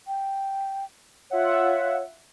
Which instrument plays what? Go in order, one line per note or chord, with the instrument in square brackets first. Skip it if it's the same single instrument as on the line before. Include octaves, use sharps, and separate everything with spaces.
[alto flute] G5
[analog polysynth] F4 E5 F#5 [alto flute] C#5